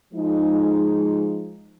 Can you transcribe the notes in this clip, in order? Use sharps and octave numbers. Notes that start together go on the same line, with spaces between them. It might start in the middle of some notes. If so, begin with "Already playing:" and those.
F3 G#3 D#4